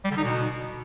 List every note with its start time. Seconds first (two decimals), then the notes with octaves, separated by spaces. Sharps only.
0.05 G3
0.11 D3
0.17 D#4
0.23 B2